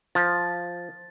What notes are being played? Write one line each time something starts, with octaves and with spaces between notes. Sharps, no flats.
F3 A6